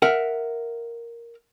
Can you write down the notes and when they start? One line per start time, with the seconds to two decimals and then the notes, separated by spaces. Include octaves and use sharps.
0.02 A#4 E5 F#5